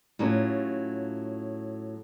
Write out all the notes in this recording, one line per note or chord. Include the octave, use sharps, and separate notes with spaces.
A2 F#3 C#4 F4